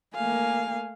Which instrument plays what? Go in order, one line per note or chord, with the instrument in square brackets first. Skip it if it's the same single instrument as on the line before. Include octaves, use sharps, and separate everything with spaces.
[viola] A3 F5 [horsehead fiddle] A#3 G#5